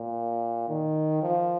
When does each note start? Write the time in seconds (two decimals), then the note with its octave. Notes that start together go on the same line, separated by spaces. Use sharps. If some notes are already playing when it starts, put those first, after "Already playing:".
Already playing: A#2
0.68 D#3
1.22 F3